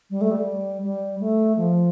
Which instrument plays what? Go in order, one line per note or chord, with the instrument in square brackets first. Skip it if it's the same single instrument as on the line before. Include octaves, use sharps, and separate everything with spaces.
[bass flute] G3
A3
G3
G3
A3
F3